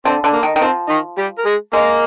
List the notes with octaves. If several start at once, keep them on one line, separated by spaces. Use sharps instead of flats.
D3 C4
D3
A#3
D#3
D#3
F3 C4
D#3 D#4
G3 G4
A#4
G#3 G#4
G#3 A#3 A#4